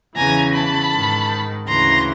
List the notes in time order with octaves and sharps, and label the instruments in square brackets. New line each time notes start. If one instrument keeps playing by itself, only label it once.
[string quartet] E2 C#3 E3 G#5 A#5
A5 B5
G#2 D#3
D2 C#3 E3 A#5 C6